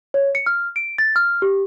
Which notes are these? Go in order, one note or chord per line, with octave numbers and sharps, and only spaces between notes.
C#5
C#7
F6
D7
A6
F6
G4